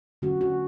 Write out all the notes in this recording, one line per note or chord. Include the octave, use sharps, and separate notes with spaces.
D3 F#3 A3 C#4 F#4
F#4